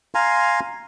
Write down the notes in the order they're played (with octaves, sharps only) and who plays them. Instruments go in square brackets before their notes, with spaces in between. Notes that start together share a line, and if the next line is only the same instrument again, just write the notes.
[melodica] F5 G#5 A#5 C6